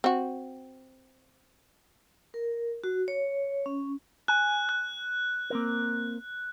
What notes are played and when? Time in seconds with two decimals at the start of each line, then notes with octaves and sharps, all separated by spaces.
0.04 C4 F#4
2.34 A#4
2.84 F#4
3.08 C#5
3.66 C#4
4.28 G#5 F#6
4.69 F#6
5.50 A#3 C4 A#4